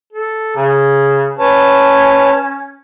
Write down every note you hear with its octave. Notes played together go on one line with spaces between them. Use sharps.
A4
C#3
C#4 B4 C#5 A5